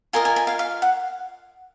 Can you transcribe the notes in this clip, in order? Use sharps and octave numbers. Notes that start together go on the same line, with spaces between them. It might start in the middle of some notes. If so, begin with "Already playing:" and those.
F4 A#4 D#5 G#5
G#5
G#5
F5
F5
F#5